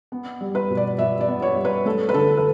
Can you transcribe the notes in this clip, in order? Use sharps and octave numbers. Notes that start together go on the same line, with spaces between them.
B3
G3
B4
B2
D5
B2 E5
D5
B3
C#5
G3
B4
A3 A4
B4
D3 A4
B4